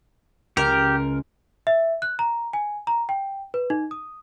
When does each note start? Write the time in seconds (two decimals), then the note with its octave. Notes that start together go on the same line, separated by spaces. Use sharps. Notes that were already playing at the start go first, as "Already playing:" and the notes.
0.57 C#2 G4 A#4
1.67 E5
2.02 F#6
2.19 A#5
2.53 G#5
2.87 A#5
3.09 G5
3.54 B4
3.70 D#4
3.91 D#6